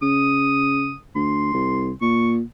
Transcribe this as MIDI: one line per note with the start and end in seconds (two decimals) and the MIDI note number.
0.02 0.94 49
0.02 0.98 87
1.15 1.52 38
1.15 1.90 84
1.54 1.93 36
2.02 2.42 46
2.02 2.32 85